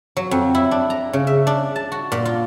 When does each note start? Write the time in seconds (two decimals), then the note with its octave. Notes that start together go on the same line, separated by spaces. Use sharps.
0.17 F#3
0.31 F2
0.55 E4
0.71 D4
0.90 A#5
1.13 C#3
1.27 E5
1.47 D4
1.76 A5
1.92 F#4
2.12 A#2
2.25 F4